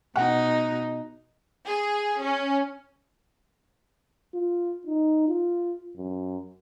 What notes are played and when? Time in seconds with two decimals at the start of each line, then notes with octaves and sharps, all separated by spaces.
0.16 B2 D#4 F#5
1.67 G#4
2.22 C#4
4.34 F4
4.87 D#4
5.28 F4
5.97 F#2